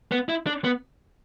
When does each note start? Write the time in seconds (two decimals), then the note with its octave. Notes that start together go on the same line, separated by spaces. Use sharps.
0.12 B3
0.29 E4
0.47 D4
0.64 B3